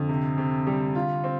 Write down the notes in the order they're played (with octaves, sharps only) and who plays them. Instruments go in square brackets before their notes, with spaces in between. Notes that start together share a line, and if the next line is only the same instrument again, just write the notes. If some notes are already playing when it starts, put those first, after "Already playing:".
Already playing: [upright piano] F2 [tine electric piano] D3
[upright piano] C3
C3
G3
F4
C4